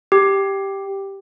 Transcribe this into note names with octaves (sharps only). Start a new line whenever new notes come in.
G4